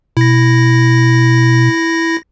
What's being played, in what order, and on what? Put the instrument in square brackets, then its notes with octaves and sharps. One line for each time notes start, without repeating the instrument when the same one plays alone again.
[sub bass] B2 [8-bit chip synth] E4 A#6